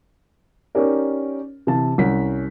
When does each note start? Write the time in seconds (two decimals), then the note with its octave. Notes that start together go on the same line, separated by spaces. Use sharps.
0.75 C#4 D#4 G4 A#4 D5
1.67 C3 E3 A5
1.98 C2 C#4 B6